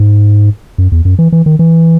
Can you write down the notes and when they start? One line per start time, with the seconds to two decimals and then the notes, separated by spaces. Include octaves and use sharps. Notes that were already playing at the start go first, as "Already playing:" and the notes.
Already playing: G#2
0.78 F#2
0.92 E2
1.05 F#2
1.19 E3
1.32 E3
1.46 D#3
1.59 E3